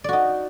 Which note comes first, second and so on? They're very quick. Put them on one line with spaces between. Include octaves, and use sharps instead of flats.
D5 F#4 D#4